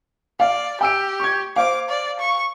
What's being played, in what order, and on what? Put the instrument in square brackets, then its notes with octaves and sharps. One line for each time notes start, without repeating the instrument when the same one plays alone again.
[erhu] D5 [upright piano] F5
[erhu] G4 [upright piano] G5 E6 D7
[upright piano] C#6 G#6
[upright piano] C5 F5 [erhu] D6
[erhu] D5
C#6